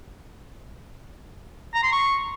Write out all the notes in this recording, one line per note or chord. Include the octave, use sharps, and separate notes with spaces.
A#5
C6
C#6